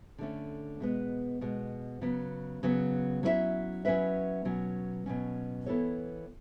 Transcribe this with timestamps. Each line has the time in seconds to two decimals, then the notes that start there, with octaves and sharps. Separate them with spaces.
0.18 D3 A3 C#4
0.80 B2 G#3 B3
1.41 B2 G#3 B3
2.01 C#3 F#3 B3
2.63 C#3 F#3 B3
3.23 F#3 C#4 E4 B4 E5
3.85 F#3 C#4 E4 B4 E5
4.45 B2 F#3 C#4
5.06 B2 F#3 C#4
5.66 E3 B3 E4 A4 C#5